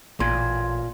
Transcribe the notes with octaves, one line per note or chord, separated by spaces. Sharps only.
A1 A#2 C6 G#6